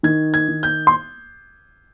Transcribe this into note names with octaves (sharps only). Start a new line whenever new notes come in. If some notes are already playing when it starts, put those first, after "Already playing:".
D#3 G#6
G#6
D#3
G6
C6